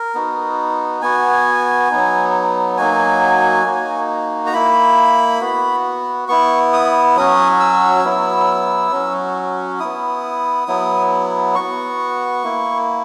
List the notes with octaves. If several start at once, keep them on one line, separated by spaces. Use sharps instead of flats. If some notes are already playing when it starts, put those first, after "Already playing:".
Already playing: A#4
B3 D#4 F#4
B3 F#4 G#5
F#3 B3 D#4
F#3 A#3 D#4 F#4 G#5
A#3 D#4 F#4
A#5
A#3 E4 B5
B3 F#4
B3 E4 C#6
D#6
F#3 C#4 F#4 D#6
E6
F#3 B3 E4
F#3 C#4 F#4
B3 E4 D#6
F#3 B3 E4
B3 F#4 C#6
A#3 E4